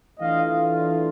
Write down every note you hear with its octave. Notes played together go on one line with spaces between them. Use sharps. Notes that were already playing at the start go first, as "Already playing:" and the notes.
E3 A3 D4 F4 D#5 F5